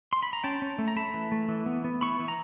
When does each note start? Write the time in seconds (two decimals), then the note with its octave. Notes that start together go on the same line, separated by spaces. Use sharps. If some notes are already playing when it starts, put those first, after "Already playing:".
0.13 C6
0.23 B5
0.33 A#5
0.44 C#4 G5 A5
0.62 C#4
0.79 A3
0.88 A#5
0.96 A3 A5 B5
1.14 E3
1.32 A3
1.49 E3
1.66 B3
1.84 B3
2.01 E3 B5 C#6
2.19 E3
2.28 A#5